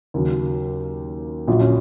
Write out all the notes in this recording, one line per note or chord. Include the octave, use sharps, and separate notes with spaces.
D#2 C#3 F#3
A#1 A#2 F#3 F4
C#4